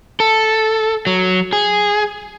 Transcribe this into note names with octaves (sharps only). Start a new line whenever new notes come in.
A4
F#3
G#4